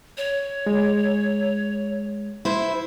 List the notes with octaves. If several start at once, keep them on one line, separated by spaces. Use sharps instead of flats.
C#5
G#3
E4 C5